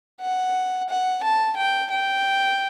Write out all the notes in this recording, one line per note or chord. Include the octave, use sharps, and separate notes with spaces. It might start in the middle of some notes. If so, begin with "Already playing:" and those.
F#5
F#5
A5
G5
G5